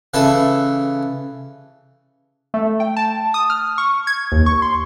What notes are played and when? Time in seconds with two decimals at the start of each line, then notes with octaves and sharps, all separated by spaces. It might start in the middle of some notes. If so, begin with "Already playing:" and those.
0.14 C#3 E3 E4 A4 B4
2.54 A3
2.80 G5
2.96 A5
3.34 D#6
3.50 F6
3.78 C#6
4.07 G#6
4.32 D#2
4.46 C#6
4.62 C6